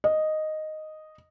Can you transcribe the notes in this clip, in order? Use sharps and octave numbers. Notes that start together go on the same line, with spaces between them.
D#5